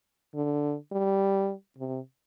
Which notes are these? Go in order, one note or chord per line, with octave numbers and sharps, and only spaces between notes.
D3
G3
C3